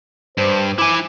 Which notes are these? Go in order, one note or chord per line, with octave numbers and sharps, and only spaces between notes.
G2 C5
E4 G#5 D6